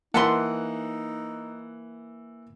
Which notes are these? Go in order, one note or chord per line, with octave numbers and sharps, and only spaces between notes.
E3 A#3 D#4 A4 B4 F#5 C6